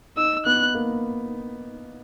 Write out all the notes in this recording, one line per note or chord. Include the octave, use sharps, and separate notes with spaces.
D#4 E6
B3 F#6
A#3